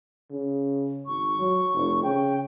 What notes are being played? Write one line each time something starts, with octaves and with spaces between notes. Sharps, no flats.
C#3
G#1 C#6
F#3
F1
C#3 G5